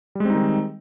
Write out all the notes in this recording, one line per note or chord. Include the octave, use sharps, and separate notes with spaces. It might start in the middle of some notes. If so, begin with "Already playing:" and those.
D#3 G3 G#3 C4 D#4